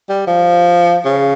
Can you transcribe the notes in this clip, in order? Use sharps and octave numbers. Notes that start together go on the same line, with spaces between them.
G3
F3
C#3